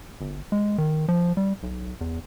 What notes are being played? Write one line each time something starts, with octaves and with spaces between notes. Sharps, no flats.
G1
G#3
D#3
F3
G3
B1
E2